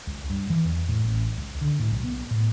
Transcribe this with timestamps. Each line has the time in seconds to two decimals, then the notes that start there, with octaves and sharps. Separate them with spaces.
0.07 C#2
0.30 G2
0.50 E3
0.64 E2
0.88 A2
1.05 A1
1.38 C#2
1.61 D3
1.79 A2
1.91 B1
2.04 B3
2.31 A2